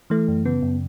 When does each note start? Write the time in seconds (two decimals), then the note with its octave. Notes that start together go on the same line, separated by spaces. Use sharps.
0.10 E3 A3
0.28 F#2
0.45 C#3 B3
0.63 F#2